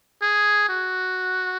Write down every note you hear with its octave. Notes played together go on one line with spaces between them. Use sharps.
G#4
F#4